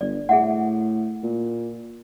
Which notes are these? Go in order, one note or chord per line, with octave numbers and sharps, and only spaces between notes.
G1 D5
A2 G#4 E5 F#5
A#2